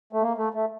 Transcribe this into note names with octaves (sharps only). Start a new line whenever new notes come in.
A3
A#3
A3
A3